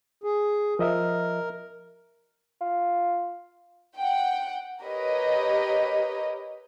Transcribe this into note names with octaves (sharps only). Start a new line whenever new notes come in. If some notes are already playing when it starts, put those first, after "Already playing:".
G#4
F3 A#4 D#5 E5
F4
F#5 G5
G4 A#4 B4 C#5 D#5